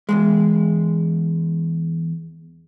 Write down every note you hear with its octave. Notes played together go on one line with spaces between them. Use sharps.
E2 G2 G#3